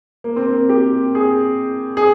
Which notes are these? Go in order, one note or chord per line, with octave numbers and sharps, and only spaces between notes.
A#3
C4
A#3
G4
G#4
G#4